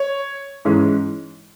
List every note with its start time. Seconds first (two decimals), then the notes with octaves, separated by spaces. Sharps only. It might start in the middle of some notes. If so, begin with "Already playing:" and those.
Already playing: C#5
0.65 G#2 E3 G#3 C#4